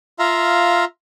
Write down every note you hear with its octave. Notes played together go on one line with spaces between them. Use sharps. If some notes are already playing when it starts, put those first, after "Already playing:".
F4 E5 F5 A#5